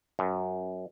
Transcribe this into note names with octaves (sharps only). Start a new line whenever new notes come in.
F#2